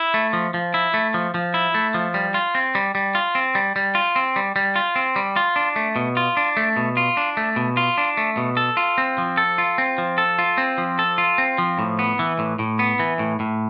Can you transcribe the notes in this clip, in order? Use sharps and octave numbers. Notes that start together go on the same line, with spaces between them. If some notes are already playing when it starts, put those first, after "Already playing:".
Already playing: E4
A3
F3
F3
E4
A3
F3
F3
E4
A3
F3
G3
F4
C4
G3
G3
F4
C4
G3
G3
F4
C4
G3
G3
F4
C4
G3
F4
D4
A3
B2
F4
D4
A3
B2
F4
D4
A3
B2
F4
D4
A3
B2
A4
F4
C4
F3
A4
F4
C4
F3
A4
F4
C4
F3
A4
F4
C4
F3
A2
B3
E3
A2
A2
B3
E3
A2
A2